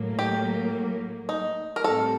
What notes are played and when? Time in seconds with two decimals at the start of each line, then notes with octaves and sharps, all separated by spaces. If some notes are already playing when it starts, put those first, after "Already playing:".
Already playing: A2 F#3 A#3
0.19 G4
1.29 D#4
1.76 A#4
1.84 A2 G3 C4 A4